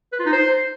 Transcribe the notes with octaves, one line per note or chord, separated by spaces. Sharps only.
B4
F4
D#4
C5